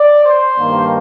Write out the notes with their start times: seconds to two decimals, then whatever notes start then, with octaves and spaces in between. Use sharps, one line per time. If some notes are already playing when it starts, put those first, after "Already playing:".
Already playing: D5
0.26 C5
0.59 G2 D#3 A#3